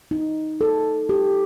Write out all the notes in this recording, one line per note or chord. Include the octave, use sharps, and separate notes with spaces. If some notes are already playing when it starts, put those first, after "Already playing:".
D#4
A4
G4